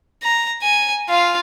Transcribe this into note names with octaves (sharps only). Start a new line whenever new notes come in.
A#5
G#5
F4 F5